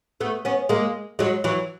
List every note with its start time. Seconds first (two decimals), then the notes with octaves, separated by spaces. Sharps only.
0.21 A3 B3
0.45 B3 C#4
0.69 G#3 A#3
1.19 F#3 G#3
1.44 E3 F#3